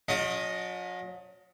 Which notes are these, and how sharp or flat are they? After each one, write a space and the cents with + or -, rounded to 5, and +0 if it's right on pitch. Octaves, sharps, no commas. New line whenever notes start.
F#3 -45 C#4 +35 D#5 +0